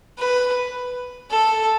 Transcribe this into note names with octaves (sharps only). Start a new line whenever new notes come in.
B4
A4